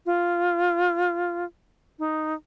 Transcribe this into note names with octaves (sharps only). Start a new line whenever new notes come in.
F4
D#4